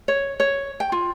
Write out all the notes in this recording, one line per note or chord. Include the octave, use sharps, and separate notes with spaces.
C#5
C#5
G5
F4